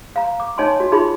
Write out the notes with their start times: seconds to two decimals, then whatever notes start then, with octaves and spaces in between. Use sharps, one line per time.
0.16 F5 A#5
0.40 D6
0.58 D#4 C#5 D#5 G#5 A5 C6
0.80 F#4
0.92 D#4 F4 G#4 E5 B5 C6